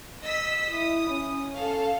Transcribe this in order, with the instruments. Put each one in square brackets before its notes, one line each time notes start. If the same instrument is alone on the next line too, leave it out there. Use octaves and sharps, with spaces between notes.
[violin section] D#5 E6 B6
[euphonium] E4 [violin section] D#6
[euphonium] C#4
[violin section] A4 F5